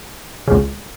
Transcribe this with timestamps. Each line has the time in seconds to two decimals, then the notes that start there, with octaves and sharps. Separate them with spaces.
0.48 C#2 C#3